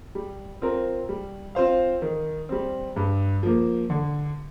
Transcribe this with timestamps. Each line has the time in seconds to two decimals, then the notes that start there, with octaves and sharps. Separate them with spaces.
0.15 G3
0.62 C4 F4 A#4
1.09 G3
1.55 C4 F4 C5 F5
2.02 D#3
2.49 G3 C4
2.96 G2
3.43 F3 A#3
3.90 D3